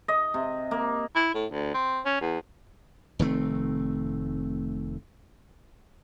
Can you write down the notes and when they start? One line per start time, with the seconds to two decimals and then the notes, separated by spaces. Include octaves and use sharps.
0.08 D#5
0.34 C3
0.71 A#3
1.16 E4
1.35 A2
1.52 D2
1.74 C4
2.06 C#4
2.21 E2
3.19 F1 D#3 A3 C4